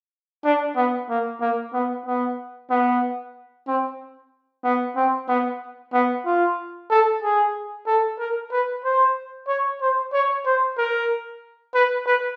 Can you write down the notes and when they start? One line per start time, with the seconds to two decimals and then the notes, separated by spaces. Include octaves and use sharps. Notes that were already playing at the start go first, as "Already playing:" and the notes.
0.44 D4
0.76 B3
1.09 A#3
1.41 A#3
1.73 B3
2.06 B3
2.70 B3
3.67 C4
4.64 B3
4.96 C4
5.28 B3
5.93 B3
6.25 F4
6.90 A4
7.22 G#4
7.86 A4
8.19 A#4
8.51 B4
8.84 C5
9.48 C#5
9.81 C5
10.13 C#5
10.46 C5
10.78 A#4
11.74 B4
12.06 B4